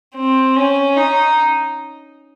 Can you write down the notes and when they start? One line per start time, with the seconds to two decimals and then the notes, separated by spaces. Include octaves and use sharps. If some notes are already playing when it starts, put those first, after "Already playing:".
0.16 C4
0.56 C#4
0.97 D#4